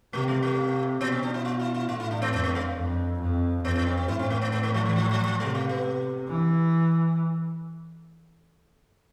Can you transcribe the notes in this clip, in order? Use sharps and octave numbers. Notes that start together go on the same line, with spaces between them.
C3 A3
G#3
A3
B2 B3
C4
D4
E4
F4
E4
E4
A2 F4
E4
D4
B3
F2 B3
A3
G#3
F2
F2
F2 B3
B3
C4
C4
A2 E4
C4
A3
B3
B3
A3
F3
E3
F3
F3
F3
C3 G#3
A3
B3
E3